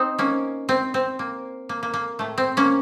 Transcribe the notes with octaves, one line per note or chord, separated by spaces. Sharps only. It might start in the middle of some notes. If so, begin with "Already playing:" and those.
Already playing: C4 D#4
A#3 C#4
C4
C4
A#3
A#3
A#3
A#3
A2 A3
C4
A#3 C#4